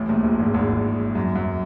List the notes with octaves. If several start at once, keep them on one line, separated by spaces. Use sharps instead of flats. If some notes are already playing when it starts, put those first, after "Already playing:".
Already playing: A1 A2
A#1 A#2
A#1 A#2
G#1 G#2
G#1 G#2
F#2
F#2